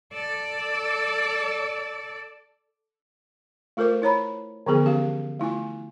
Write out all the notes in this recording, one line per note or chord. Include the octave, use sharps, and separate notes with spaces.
A4 D5
A3 F4 A4 A#4 C5 D6
E4 C#5 A#5 B5
D3 E3 F3 B3 G#4 A4
B3 C#4 G4 F5
A3 E4 F4 G#5